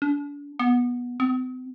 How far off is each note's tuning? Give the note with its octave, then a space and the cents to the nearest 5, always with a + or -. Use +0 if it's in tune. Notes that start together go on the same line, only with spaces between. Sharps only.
D4 -35
B3 -15
C4 -45